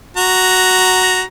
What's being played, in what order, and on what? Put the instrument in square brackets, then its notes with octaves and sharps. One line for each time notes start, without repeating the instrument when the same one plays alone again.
[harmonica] F#4 A#5